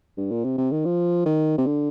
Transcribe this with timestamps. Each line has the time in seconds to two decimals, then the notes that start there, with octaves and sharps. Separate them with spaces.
0.17 G2
0.31 A#2
0.44 C3
0.58 C3
0.71 D#3
0.85 F3
1.25 D#3
1.58 C3
1.66 D3